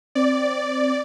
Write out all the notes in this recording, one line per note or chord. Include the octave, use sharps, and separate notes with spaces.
C4 D5